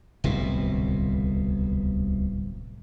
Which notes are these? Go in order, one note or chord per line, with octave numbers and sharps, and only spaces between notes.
D1 C2 B2